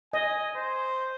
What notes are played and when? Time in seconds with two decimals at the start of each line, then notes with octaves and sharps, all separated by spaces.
0.13 D#5 G#5
0.56 C5